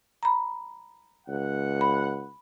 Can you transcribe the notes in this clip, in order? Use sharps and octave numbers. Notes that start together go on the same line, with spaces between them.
A#5 B5
C#2 F#5
B5